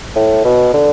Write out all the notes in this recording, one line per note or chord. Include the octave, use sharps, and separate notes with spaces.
A2
B2
D3